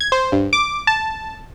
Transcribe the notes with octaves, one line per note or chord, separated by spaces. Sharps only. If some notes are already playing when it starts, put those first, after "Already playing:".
G#6
C5
G2
D6
A5